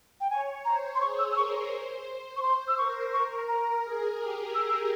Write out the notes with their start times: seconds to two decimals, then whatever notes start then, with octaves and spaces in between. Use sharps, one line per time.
0.20 G5
0.30 C#5 G#5
0.65 C5 A#5
0.95 C6
1.00 G#4 C#6
1.19 E6
1.32 E6
1.36 A#4 C#6
1.72 C5
2.36 C#6
2.42 C5 C6
2.68 E6
2.78 A#4 C#6
3.13 A#4 C#6
3.48 A#5
3.84 G#4
4.19 G4
4.54 E6
4.69 E6